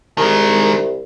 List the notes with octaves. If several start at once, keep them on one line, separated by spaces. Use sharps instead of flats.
C2 D#3 G#3